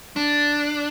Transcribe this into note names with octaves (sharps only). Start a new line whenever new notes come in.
D4